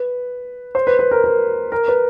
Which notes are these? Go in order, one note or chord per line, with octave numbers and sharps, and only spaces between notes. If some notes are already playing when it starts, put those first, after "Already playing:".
Already playing: B4
C5
B4
B4
A#4
A#4
A#4
B4